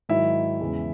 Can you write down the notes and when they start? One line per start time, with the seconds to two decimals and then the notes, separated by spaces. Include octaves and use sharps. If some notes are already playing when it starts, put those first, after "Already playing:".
0.09 G#2 D#3 F#3 E4 E5
0.61 E2 C#3 E3 G#3